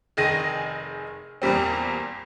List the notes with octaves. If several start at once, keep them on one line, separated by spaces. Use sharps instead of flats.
F1 D#3 G#4 A#6 D#7
E2 A#2 G3 C4